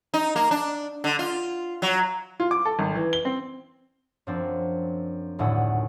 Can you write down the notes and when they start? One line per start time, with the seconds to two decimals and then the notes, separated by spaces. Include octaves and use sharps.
0.14 D#4
0.36 A#3
0.51 D4
1.04 D3
1.19 F4
1.82 F#3
2.40 F4
2.51 D6
2.65 A4
2.79 G#1
2.95 E3
3.13 G7
3.25 C4
4.27 F#2 F3 C4 D4
5.39 D#1 D2 A2 F#5 G#5 E6